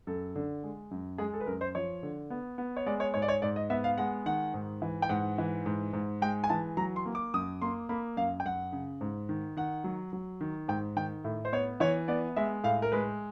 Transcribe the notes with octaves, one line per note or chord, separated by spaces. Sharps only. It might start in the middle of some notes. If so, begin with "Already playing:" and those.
F#2 A4
D3
G#3
F#2
G#3 G#4
A4
B4
F#2 A#4
C5
F3 C#5
D3
B3
B3
C#5
G#3 D5
C#5
G#2 C#5
D5
C#5
G#2 D5
D#5
B3 E5
F5
G#3 F#5
D#3 F#5
G#2
E3
G5
G#2 F#5
E3
G#2
G#2
G#3 G5
G#5
E3 A5
F#3 A#5
C6
A#3
D6
F#2 D#6
A#3 C6
A#3 B5
F#2 F5
G5
F#2 F#5
C#3
G#2
D#3
D#3 F#5
F#3
F#3
D#3
G#2 G5
D#3 G5
A2
C5
B3 C#5
E3 C#5
B3 D5
G#3 E5
A2 F5
A#4
G#3 B4